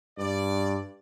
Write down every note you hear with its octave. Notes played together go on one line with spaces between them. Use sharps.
G2 D5